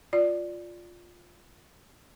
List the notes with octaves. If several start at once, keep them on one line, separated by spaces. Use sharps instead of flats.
F4 D5